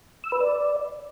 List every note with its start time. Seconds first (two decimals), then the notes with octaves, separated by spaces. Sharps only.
0.24 E6
0.32 B4
0.40 D5